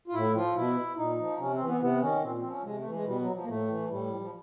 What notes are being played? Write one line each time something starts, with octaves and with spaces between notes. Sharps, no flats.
F4
A2 E4
F3 F4
B2 E4
A#2 D#4
F3
C3 C#4
C4
E3
B3
C3 B3
D#3 C#4
A#2 C4
C4
F3
C#4
C3 G#3
A3
E3
G#3
B2 G3
F#3
F3
A#3
A2 A3
E3
A2 G3
F3
F3